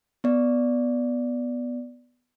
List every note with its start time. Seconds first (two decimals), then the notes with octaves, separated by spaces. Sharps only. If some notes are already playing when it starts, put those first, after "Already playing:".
0.24 B3 D5